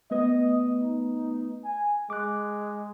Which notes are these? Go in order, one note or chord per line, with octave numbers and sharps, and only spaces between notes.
A3 B3 B4 D#5
D#4
G#5
G#3 D6 F#6